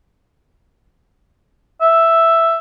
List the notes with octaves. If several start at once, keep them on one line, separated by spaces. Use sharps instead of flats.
E5